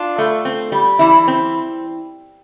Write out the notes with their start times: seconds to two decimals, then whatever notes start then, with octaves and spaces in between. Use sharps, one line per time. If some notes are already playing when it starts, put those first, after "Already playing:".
Already playing: D4 F4
0.18 A3
0.45 C4
0.72 G3
0.99 E3 E4
1.28 C4